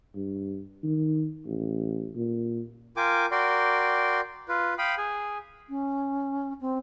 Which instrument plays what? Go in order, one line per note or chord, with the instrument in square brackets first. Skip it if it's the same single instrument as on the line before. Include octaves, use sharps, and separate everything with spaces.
[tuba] G2
D#3
A1
A#2
[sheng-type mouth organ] F4 A#4 G5 G#5 D6
F#4 A#4 D5 G5 C6
F4 B4
F5 G5 B5 D#6
G#4 G#5
[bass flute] C#4
C4